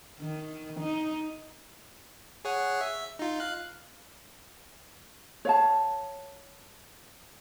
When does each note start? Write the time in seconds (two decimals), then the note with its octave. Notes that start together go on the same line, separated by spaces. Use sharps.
0.19 D#3
0.80 D#4
2.45 G#4 C#5 F#5
2.81 E5
3.19 D#4 F4
3.40 F5 F#6
5.45 C#5 F5 A5